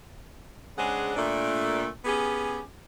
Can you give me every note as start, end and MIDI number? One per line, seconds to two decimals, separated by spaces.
0.77 1.15 49
0.77 1.15 56
0.77 1.15 60
0.77 1.15 62
0.77 1.15 68
0.77 1.15 78
1.17 1.87 46
1.17 1.87 57
1.17 1.87 62
2.05 2.59 59
2.05 2.59 61
2.05 2.59 67
2.05 2.59 68